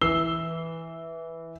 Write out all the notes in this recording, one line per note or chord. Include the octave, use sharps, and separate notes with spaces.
E3 E6 C7 G7